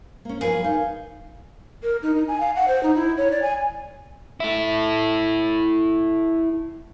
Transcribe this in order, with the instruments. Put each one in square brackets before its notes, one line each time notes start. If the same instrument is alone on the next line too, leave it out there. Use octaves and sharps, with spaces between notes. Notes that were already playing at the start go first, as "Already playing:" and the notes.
[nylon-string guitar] A#3 C#4
[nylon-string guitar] F3 F#3 B4 [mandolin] G#4 [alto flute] A#4
[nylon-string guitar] D#4 [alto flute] F5
[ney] A#4
D#4
D#4
G#5
F5
F#5
C5
D#4
E4
C#5
D5
G#5
[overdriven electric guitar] E4 A4